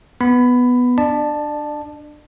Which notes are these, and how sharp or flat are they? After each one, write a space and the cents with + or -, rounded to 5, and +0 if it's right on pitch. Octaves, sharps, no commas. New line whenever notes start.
B3 +0 B5 +15
D4 +15 D5 +35 A5 -5